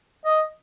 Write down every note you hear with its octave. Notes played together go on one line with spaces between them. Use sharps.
D#5